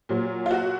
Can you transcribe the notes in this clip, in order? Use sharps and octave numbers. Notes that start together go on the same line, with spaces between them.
A#2 F#3
F4
F#4